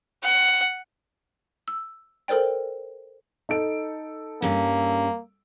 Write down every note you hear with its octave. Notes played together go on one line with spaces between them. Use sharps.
F#5
E6
A4 A#4 C5 D5 G5
D#4 A4 D7
G2 A#3 C#4